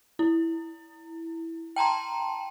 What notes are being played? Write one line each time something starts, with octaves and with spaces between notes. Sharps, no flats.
E4
G5 A5 A#5 C6